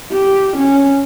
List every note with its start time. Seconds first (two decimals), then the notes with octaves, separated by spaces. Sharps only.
0.11 G4
0.57 C#4